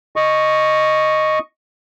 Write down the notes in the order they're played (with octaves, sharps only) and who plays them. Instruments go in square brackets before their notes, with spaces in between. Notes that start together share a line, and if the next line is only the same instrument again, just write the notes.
[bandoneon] D#5 C#6